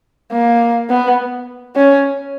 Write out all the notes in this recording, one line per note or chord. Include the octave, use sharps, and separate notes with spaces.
A#3
B3
C#4